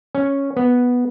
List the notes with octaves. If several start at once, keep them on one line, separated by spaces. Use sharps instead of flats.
C#4
B3